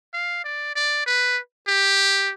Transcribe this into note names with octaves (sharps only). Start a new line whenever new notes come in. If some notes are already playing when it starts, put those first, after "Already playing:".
F5
D5
D5
B4
G4